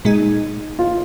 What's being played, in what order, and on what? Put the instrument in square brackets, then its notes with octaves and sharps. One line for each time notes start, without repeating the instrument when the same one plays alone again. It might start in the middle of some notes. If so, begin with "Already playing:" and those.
[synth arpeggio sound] A#2 G#3 D#4 [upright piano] G#4
[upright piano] F4